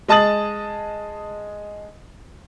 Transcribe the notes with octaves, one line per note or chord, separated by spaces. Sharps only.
G#3 D#5 A5 D#6 A6 F#7